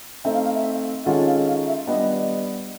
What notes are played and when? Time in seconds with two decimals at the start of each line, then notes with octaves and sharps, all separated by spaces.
0.24 A3 C4 D#4 E5
0.34 F5
0.45 F5
0.54 E5
1.06 D#3 G#3 C#4 F4 A4 F#5
1.27 F5
1.47 F5
1.67 E5
1.87 G3 B3 D4 D#5